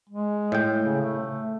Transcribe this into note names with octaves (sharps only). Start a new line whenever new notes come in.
G#3
A2 G5
C#3
A3